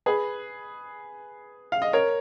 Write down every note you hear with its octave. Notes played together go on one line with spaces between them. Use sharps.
G#4 B4
F5
D#5
A#4 C#5